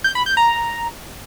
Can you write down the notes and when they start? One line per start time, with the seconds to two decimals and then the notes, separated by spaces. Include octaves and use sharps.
0.04 G6
0.15 B5
0.26 G6
0.37 A#5